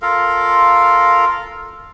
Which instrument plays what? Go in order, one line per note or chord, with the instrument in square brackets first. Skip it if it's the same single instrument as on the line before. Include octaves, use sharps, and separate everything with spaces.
[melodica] F4 A4 A#4 F5